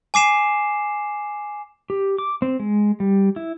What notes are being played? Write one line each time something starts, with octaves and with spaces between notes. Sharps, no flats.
G#5 D6 C7 E7
G4
D6
C4
G#3
G3
E4